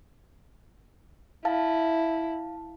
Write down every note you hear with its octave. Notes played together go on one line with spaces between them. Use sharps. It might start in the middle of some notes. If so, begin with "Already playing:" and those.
E4 F5 A5